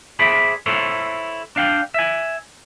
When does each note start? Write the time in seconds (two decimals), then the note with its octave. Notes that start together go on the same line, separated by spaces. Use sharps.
0.19 G#4 C5 D5 E5 B5
0.66 E4 A4 C5 C#5
1.56 D4 F5 G5
1.94 E5 G#5